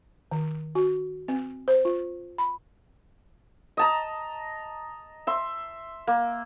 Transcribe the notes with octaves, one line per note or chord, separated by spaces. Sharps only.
D#3
F#4
C4
C5
F4
B5
D#5 A5 A#5
E5 C6
A#3